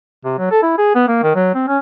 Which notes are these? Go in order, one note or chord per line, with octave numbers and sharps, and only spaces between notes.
C3
F#3
A4
E4
G#4
B3
A#3
D#3
F#3
C4
C#4